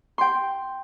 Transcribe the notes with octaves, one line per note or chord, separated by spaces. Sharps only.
G5 C6